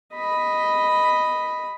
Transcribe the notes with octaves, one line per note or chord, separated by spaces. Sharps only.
D#5 B5